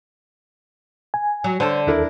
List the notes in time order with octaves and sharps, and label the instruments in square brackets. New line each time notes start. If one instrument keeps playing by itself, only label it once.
[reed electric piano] G#5
[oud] F#3
[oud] D3 [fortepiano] C5 C#5 A5
[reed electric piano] D#2 A4 [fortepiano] D4 E4 A#4